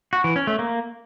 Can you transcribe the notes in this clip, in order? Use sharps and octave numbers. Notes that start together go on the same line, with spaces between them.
F#4
E3
C#4
A3
A#3